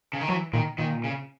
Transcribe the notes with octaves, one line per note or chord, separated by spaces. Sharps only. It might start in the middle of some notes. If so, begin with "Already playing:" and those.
C#3
D#3
E3 F#3
A#2 D#3
A#2 D#3
C#3